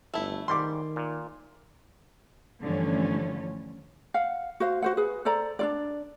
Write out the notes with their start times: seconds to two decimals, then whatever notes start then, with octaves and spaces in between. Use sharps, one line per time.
0.14 G1 A3 E4
0.48 G#2 D#3 G3 C6 D6
0.96 A#2
2.62 G2 D3 E3 F3 A3 C#4
4.14 F5 F#5
4.60 F#4 C5 F5
4.82 F#4 C5 F#5
4.97 G#4 B4
5.25 A4 C5 D5 A#5
5.59 D4 F4 D5